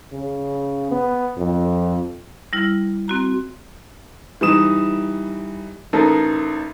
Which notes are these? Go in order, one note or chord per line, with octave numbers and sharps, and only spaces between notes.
C#3
B3
F2
G3 E4 F6
C4 F#4 A#5
E3 G3 D#4 D#6 E7
A1 D#4 A4 A#4